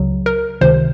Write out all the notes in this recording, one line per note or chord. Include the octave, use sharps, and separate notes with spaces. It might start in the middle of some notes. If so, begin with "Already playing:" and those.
Already playing: C#2 C#3 F#3
A#4
C#2 C3 D#3 C5